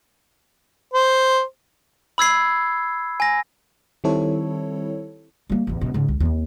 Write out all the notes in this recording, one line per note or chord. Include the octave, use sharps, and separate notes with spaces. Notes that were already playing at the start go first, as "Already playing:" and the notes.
C5
B5 E6 G#6 C7
G#5 A#6
D#3 G3 C4 E4 A4 C#5
G3 A#3
A1 E2
F#2 B2
G#2 C#3
C2
D#2 C4